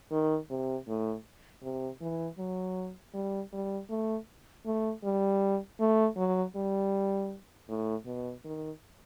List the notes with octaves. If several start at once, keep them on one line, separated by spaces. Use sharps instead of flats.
D#3
C3
A2
C3
E3
F#3
G3
G3
A3
A3
G3
A3
F#3
G3
A2
B2
D#3